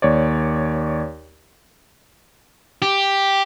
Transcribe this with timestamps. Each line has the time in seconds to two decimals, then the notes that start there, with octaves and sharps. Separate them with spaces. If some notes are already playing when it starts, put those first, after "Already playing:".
0.02 D#2 C#5 D5
2.82 G4